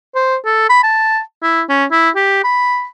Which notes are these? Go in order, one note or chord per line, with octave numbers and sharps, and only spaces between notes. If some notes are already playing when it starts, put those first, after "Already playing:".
C5
A4
B5
A5
E4
C#4
E4
G4
B5